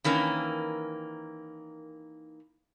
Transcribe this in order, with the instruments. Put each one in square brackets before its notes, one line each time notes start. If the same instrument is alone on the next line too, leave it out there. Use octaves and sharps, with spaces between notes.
[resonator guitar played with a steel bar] D#3 E3 A#3 C#4